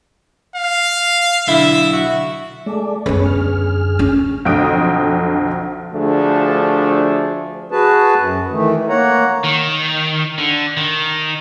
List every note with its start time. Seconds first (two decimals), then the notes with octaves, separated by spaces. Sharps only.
0.55 F5
1.47 B1 D3 E4 E5
1.92 F#4
2.66 G#3 A3 D5
3.06 F#2 B3 G#4 B4 C#5
3.26 D2 G#4 F6
3.99 C#4
4.45 B1 F2 D3 G5 D#6 D7
5.93 D2 F3 A3 D4 G#4
7.72 F#4 G#4 B4 A5
8.17 F#2
8.51 D#3 E3 A3
8.89 A#3 C#5 F#5 A#5
9.44 D#3
10.38 D3
10.77 D#3